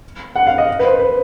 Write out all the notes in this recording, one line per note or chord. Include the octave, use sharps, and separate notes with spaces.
F#5
F5
D#5
B4
C5
B4